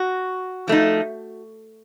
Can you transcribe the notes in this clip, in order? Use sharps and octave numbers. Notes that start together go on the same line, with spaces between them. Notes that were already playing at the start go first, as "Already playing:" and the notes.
Already playing: F#4
F3 A3 D#4